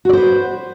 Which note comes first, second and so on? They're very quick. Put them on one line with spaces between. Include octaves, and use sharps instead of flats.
F#4 D5 C5 B4